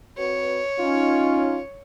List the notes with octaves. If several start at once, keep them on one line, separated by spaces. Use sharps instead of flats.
C4 F#4 B4 C#5
C#4 D#4 F4